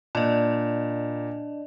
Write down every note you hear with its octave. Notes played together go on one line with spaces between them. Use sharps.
A#2 D4 D5 D#5